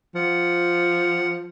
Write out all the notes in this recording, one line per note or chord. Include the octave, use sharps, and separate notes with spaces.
F3 F#5